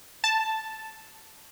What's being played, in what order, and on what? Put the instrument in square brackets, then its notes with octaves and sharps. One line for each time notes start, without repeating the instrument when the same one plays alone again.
[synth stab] A5